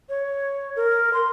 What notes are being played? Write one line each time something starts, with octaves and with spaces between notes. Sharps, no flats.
C#5
A#4
C6